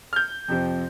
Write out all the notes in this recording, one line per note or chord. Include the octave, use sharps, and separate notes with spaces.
F6
G6
F2 C3 F3 C4